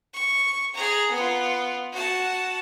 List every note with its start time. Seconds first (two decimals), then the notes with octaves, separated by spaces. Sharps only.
0.14 C#6
0.73 G#4 A#5
1.11 B3 F4
1.92 F#4 A5